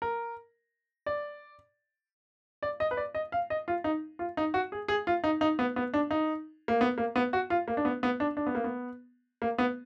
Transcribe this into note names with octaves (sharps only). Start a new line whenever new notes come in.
A#4
D5
D5
D#5
B4
D5
D#5
F5
D#5
F4
D#4
F4
D#4
F#4
G#4
G#4
F4
D#4
D#4
B3
B3
D4
D#4
A#3
B3
A#3
B3
F#4
F4
A#3
D4
B3
B3
D4
D4
B3
A#3
B3
A#3
B3